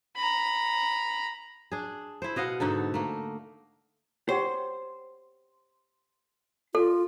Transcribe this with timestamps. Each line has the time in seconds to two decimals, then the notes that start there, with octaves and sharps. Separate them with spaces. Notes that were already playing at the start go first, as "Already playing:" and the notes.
0.16 A#5 B5
1.71 D4 G#4
2.22 E4 C5
2.36 B2 D#5 F5 F#5
2.60 G#2 D3 D#4 A4
2.94 A3 A#3
4.29 F#4 G4 C5 C#5
6.75 F4 A4